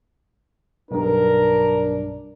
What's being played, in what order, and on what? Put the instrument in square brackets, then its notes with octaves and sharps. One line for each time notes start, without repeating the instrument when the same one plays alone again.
[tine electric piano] B1 G2 [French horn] D4 [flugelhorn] A#4